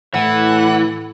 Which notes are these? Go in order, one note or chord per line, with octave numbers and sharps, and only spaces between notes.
A2 E3 F#5